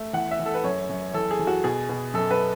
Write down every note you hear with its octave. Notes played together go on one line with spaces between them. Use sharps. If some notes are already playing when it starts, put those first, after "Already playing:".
Already playing: A3
E2 F#5
E5
E2
A4
B4
F#2 C#5
F#2
E2 A4
G#4
E2
F#4
B2 G#4
B2
F#2 A4
B4